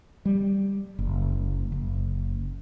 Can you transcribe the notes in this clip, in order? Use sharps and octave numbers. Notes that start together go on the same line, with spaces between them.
G3
F#1
F#1